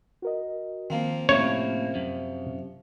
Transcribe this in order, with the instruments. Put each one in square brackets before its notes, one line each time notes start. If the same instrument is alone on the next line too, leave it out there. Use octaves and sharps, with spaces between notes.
[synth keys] F#4 A#4 D#5
[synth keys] D#3 [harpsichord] F3 A#3 C4
[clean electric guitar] A2 A#3 [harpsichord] C3 F3 [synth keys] C#4 [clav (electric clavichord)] C#5
[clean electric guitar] F#2